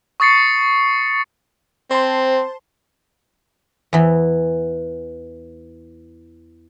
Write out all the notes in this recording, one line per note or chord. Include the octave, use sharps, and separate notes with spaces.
C#6 D#6 A6 C7 C#7
C4 C5 A5 C6
E2 E3